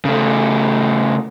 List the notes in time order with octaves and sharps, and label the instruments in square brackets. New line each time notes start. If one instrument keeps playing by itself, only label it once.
[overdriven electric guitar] C#3 A3